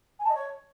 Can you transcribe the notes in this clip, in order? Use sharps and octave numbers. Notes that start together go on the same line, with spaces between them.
G#5
A5
D#5
C#5